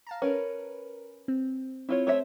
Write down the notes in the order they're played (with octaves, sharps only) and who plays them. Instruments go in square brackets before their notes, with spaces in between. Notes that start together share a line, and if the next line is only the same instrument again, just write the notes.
[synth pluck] F5 A5 A#5
[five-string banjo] C#4 [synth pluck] A#4 B4
[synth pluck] C4
[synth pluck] C4 [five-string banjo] E4 F4 C#5
[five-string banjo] A3 C#5 E5 [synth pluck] C5